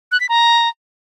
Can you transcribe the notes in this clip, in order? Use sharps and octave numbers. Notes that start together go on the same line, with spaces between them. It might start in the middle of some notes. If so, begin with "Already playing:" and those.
F#6
B6
A#5